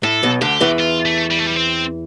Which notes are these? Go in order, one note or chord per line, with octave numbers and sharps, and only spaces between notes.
A2 A4
B1 B2
D2 D3 G4
E2 E3
F4
A3
G3
A3
G3
C4